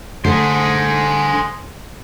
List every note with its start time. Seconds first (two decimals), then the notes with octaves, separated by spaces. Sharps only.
0.25 D3 A3 G#4 A4 C5